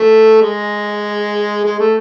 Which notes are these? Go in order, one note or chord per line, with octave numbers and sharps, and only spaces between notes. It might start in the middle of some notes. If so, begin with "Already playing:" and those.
Already playing: A3
G#3
G#3
A3